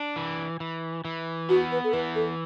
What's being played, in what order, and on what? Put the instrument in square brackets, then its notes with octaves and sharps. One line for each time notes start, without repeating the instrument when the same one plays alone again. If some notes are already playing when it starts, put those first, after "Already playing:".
Already playing: [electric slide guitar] D4
E3
E3
E3
[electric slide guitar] B3 [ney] F#4
[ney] B4
A4
[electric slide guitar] E3 [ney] B4
[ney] A4